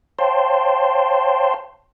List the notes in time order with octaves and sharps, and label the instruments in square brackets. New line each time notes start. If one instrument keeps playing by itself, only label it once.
[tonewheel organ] C5 C#5 F5 G5 A5 C6